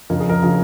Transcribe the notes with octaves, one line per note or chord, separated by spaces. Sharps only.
F2 C#3 F3 A#4
G#4
A#4
C#3 F3